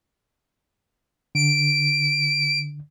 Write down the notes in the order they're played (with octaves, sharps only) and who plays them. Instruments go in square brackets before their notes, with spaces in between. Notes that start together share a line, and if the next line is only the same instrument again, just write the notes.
[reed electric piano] D3 [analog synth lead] D7